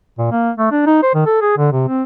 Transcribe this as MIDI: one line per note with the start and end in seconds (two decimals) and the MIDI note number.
0.18 0.27 46
0.32 0.50 58
0.58 0.71 57
0.71 0.86 62
0.86 1.02 63
1.03 1.13 72
1.14 1.23 51
1.26 1.37 69
1.41 1.56 68
1.57 1.69 50
1.72 1.85 48
1.88 2.03 60